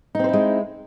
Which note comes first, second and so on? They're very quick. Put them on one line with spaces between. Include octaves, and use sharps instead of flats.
D#4 C4 C5 E4 G#3